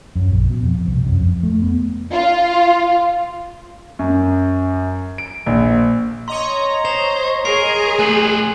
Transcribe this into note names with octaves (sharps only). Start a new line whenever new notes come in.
F#2
A#1
B2
F2
C2
F#2
F2
A3
B3
F4
F#2
D7
A#1
C#5 D#5 A#5 C6
C5 F7
G#4 A#4 C7
A3 G4 G#5 F#6 F#7